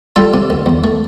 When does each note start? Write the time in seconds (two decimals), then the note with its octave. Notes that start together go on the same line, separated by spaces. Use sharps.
0.16 G3 F4 A4
0.34 C3
0.50 D2
0.66 E2
0.84 A3